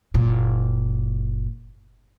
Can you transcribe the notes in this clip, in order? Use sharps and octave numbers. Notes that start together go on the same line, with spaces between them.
F#1 A#2